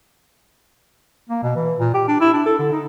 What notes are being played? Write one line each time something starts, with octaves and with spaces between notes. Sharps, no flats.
A#3
B2
E3
A#2
G4
D4
E4
D4
A4
D3
D#4